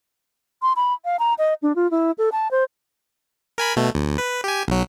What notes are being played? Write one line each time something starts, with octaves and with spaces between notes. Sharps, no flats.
C6
B5
F5
A#5
D#5
D4
F4
E4
A4
A5
C5
A#4 G#5 B5
B2 A3
D2
B4
G4 G#5
B1 F#3